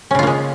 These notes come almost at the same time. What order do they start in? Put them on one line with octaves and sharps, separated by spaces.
C#4 C#3 F4 A#3 G#3